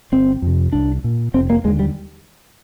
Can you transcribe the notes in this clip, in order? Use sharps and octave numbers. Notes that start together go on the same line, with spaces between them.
G1 C4
F2 C3
C2 D4
A#2
F1 C4
A#3
D#2 D3 G#3
G3